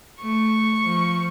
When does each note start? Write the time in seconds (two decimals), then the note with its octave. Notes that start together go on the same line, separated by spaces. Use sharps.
0.22 A3 C#6
0.83 F3